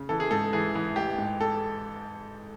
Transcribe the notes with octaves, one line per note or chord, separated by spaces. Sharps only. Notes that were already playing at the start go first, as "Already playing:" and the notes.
Already playing: C#3
E3 A4
G#4
G#2 A4
E3 G#4
E3
A1 G4
G#2
A4